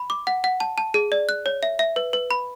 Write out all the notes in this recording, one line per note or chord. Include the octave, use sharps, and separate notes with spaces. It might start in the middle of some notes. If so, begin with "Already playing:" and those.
Already playing: B5
D6
F#5
F#5
A5
A5
G#4
D5
F#6
C#5
E5
E5
B4
B4
B5